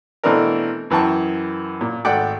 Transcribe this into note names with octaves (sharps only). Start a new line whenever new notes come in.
B2 E3 A3 C4 D4 A#4
F#2 E3 G5 A5 C#6
A#2
G#1 A3 D5 F#5 G5 D6